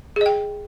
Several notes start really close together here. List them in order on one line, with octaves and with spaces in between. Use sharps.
G#4 D#5 G5